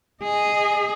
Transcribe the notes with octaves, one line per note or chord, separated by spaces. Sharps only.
G#4 D#5